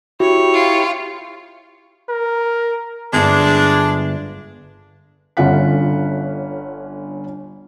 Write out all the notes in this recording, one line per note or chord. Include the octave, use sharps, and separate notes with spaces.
E4 F#4 G4 C#5
F4
A#4
G1 G#3 D4
G1 D3 C#4 F4 F#5 B6